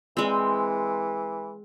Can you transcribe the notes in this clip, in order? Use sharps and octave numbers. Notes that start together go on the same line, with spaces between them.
E3 G#3 C4